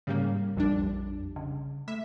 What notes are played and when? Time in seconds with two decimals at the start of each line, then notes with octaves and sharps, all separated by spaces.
0.07 G#2 C#3 G3 A#3
0.57 A#1 F2 G3 D4
0.82 F2
1.36 C#3
1.88 A3 E5